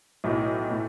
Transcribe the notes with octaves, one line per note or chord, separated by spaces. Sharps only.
B1 A2 A3
A2 A3